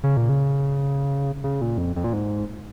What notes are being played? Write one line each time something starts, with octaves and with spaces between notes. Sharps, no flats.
C#3
A#2
C#3
C#3
A#2
F2
F2
A#2
G#2